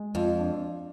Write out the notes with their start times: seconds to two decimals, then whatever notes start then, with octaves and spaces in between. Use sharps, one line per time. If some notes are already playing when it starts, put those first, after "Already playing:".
Already playing: G#3
0.15 F2 F4
0.39 D4